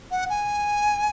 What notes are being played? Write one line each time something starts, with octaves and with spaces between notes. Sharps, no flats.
F#5
G#5